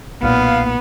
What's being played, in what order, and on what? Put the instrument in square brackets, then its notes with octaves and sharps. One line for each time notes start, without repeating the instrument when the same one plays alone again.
[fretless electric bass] B1 A#2 [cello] B3 [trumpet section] F5